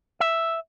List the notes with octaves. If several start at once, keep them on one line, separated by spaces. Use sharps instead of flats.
E5